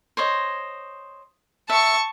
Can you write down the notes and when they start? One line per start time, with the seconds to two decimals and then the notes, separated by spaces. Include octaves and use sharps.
0.17 C5 C#5 D#5
1.70 E5 A5 C#6